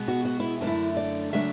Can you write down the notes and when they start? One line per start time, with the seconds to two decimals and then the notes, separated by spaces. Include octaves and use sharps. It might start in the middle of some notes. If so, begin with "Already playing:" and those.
Already playing: B2 G#3 B3
0.08 F#4
0.25 F#4
0.40 E4
0.61 F#2 D3 A3 D4
0.67 E4
0.97 D5
1.33 C#3 F#3 A3 D4 E5